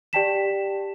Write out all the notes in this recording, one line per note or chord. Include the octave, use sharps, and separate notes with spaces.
G4 D5 G5 A5 B6 E7